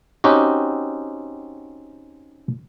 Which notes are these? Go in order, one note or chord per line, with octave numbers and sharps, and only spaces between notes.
C4 C#4 D#4 F#4 G4